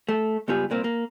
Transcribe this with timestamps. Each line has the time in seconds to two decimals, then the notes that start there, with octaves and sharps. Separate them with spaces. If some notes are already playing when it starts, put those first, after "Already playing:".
0.09 A3
0.48 C#2 G2 B3 F4 G4 G#4
0.70 C2 A#2 A#3 C4
0.84 A#3